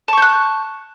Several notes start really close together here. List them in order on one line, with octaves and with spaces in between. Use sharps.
A5 C#6 G6 F#6